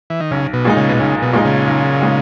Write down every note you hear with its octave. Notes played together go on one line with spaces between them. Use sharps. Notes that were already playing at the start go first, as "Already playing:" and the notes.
E3
D#3
B1 C#3
B2
A#2 G#3 D#4
C#3
B2
B1 C#3
B2
A#2 G#3 D#4
C#3
B1
A#2 G#3 D#4